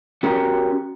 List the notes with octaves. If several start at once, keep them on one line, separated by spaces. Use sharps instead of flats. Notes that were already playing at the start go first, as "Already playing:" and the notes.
C#4 F#4 G4 A#4